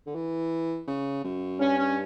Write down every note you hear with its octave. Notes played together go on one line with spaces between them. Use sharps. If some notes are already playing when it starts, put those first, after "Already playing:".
D3
E3
C#3
F#2
G2 C#4
C#4